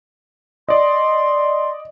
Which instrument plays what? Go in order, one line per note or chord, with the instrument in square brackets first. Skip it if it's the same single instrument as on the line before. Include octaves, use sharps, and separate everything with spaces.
[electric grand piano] D5 D#5 [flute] C6